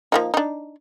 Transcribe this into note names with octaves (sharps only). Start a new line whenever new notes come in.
F3 A#3 D#4
D4 D#4